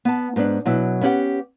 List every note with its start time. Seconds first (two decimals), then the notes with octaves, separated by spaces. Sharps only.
0.05 B3 A5
0.36 G#2 B3 C#4 D4
0.65 B2 F#3 E4
1.01 B3 C#4 E4 G4 F#5